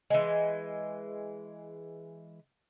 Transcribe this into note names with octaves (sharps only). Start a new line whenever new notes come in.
E3 G#3